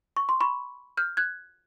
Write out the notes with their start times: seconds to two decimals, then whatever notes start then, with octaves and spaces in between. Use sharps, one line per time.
0.17 C#6
0.29 C6
0.41 B5 C#6
0.97 F6 G6
1.17 F#6 G#6